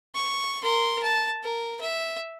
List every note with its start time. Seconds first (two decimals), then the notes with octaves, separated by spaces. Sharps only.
0.15 C#6
0.63 A#4 C6
1.03 A5
1.43 A#4
1.81 E5